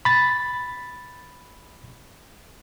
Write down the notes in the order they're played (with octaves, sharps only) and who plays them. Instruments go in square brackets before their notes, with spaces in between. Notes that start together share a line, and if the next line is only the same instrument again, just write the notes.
[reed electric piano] B5 A6